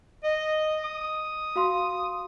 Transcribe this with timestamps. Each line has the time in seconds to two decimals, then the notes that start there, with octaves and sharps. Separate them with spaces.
0.23 D#5
0.84 D#6
1.56 F#4 F5 C6